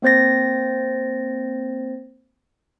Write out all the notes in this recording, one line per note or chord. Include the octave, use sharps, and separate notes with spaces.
A#3 C4 C5 A6 A#6